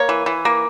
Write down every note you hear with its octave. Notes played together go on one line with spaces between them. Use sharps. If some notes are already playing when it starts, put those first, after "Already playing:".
Already playing: A#3 C#5
E3
E3
A#3